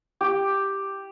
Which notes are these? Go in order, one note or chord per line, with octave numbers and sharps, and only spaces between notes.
G4